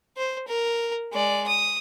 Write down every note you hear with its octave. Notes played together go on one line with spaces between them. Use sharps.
C5
A#4
G#3 D5
D#6